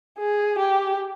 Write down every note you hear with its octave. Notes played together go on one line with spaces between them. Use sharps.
G#4
G4